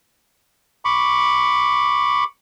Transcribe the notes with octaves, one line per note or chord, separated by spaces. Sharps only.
B5 C#6 D6